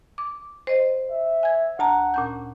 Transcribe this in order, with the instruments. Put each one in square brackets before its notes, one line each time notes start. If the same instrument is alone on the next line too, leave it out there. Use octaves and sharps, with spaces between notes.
[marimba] D6
C5 D#5
[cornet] E5
[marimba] G#5 G#6
[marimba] D2 A5 A#5 [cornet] F#5
[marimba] A#2 C#4 G6